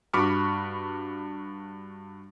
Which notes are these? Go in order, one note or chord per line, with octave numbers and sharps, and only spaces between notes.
G2 F#4 B5 C#6 D6 F6